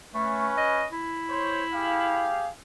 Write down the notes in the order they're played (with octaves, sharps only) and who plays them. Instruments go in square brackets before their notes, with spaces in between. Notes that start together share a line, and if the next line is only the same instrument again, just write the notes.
[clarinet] A3 [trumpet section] C#4 B4
[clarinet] D#5
E4
[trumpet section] C5 C#5
G4 G#4 F5